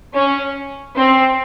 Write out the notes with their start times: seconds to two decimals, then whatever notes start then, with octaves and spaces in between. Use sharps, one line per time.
0.15 C#4
0.97 C4